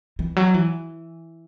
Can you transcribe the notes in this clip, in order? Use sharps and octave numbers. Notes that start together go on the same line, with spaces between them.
E3
F#3
E3